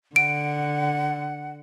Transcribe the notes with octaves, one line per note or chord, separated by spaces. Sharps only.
D3 F#5 D7